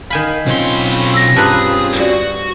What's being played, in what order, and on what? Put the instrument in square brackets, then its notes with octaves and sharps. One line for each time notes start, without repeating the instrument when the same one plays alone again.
[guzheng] D#3 G#5 B5 [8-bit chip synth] F5
[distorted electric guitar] B1 C6 [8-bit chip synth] C4 C#4 F4
[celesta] E6 A#6
[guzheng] G2 B4 A#5 [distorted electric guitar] G#4 [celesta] A5
[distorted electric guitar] F#4 [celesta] D5